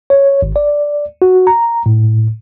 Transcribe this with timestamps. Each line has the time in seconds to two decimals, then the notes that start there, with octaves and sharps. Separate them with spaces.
0.10 C#5
0.42 G#1
0.56 D5
1.22 F#4
1.47 A#5
1.86 A2